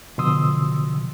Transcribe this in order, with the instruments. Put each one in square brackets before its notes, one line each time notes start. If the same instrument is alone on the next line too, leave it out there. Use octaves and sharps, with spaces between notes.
[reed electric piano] B2 D3 F3 C6 D#6 E6